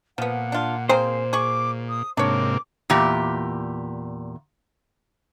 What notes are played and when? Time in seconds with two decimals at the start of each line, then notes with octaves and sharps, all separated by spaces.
0.18 A#2 F3 B3 F#5
0.52 D4 F4
0.89 C4 G#4 A#4 C5 F5
1.33 G#4 C#6 D6
1.89 D#6
2.17 G#2 C3 A#3 D4 C#5 D6
2.90 E2 A#2 G4